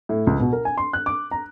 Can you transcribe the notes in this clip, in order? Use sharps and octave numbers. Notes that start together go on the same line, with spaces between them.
A2
C#2
B2
A#4
G#5
C6
F#6
D6
A#5